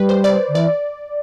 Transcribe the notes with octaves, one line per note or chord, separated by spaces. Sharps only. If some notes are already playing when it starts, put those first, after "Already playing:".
Already playing: G3 B4
C5
D5
D3
E3 D5